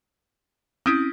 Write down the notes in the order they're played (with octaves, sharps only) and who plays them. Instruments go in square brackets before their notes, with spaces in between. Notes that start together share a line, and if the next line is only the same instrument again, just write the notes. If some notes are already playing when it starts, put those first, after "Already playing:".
[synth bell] C4 C#4 E4 [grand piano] D#6 G6 D7